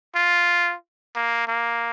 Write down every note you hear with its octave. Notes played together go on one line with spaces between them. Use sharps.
F4
A#3
A#3